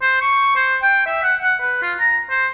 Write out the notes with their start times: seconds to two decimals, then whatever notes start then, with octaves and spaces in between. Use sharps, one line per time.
0.02 C5
0.21 C#6
0.56 C5
0.82 G5
1.06 E5
1.23 F#5
1.42 F#5
1.61 B4
1.82 F4
2.00 A#5
2.30 C5